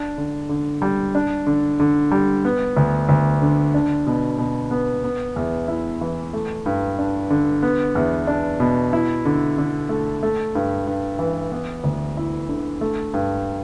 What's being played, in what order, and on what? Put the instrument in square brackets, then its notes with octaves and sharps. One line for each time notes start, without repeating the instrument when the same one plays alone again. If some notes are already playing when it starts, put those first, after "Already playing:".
Already playing: [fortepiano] D4
D3
D3
G3
D4
D3
D3
G3
B3
D2
D2
D3
D4
B2
B2
B3
B3
E2
E4
E3
A3
G2
D4
D3
B3
E2
D4
B2
E4
D3
D3
A3
A3
G2
G2
E3
B3
D2
E4
D3
A3
G2